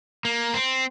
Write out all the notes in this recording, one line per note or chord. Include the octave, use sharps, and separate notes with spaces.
A#3
C4